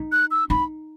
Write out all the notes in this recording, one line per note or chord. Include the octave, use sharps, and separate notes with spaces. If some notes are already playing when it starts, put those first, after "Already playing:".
Already playing: D#4
F#6
E6
D#4 B5